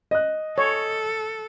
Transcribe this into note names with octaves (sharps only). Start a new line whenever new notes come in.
D#5 F#6
A4 C#5